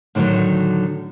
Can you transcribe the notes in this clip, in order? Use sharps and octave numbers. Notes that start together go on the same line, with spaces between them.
A2 D3 D#3 F3 F#3